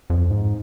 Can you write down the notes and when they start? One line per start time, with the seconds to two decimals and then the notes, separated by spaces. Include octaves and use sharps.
0.10 F2
0.31 G#2